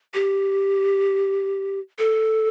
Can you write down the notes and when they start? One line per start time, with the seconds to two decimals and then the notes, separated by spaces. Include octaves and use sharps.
0.14 G4
1.99 A4